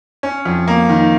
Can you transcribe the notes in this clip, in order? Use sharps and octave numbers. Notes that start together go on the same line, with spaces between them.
C#4
F2
A#3
D#3